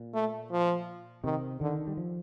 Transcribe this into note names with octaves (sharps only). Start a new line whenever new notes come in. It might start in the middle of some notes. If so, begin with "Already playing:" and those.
Already playing: A#2
A3
F3
C3 D#3
D3 D#3
G3
F3